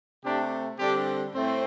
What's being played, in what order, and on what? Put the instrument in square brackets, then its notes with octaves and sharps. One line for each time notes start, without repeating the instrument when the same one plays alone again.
[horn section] C3 A3 C4 D4 G4
D3 G3 C4 D4 G4
A2 A3 C4